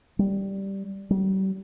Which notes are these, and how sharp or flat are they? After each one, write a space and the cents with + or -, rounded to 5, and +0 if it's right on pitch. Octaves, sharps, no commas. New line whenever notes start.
G3 -5
G3 -40